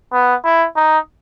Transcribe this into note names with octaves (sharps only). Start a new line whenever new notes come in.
B3
E4
D#4